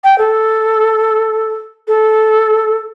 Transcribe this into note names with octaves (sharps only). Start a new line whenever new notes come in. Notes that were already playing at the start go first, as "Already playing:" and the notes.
G5
A4
A4